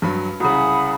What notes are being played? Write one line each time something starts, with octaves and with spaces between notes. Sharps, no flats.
G2 F#3 B5
C2 C#3 F#5 B5 D#6